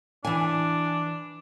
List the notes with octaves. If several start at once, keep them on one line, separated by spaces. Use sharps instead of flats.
E3 D4 G#5